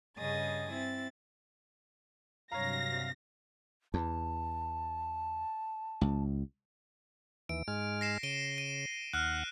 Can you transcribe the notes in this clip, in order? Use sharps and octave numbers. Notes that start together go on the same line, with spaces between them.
G2 C#3 D#5 G#5 D#6 A6
C4 E4 A6
G2 C3 F#3 C#5 F5 A#5 A#6
E2 A5
C#2
D#2 E3 D7
G#2 G#3 F6
A#6 C7 E7
C#3 D7 D#7 G7
D#7
D#2 F#5 F6 F#6